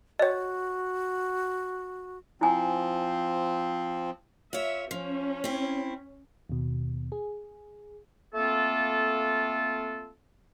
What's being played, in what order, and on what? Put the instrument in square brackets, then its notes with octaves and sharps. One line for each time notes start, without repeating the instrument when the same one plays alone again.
[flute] F#4 [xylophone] C#5 D#5
[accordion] F3 C4 [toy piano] E4 G#5
[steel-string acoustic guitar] F4 C#5 [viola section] E5
[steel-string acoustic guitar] F3 [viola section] C#4
[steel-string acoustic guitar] C4 E4
[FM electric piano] D#2 B2
G#4
[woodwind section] A3 A#3 C4 F4 A4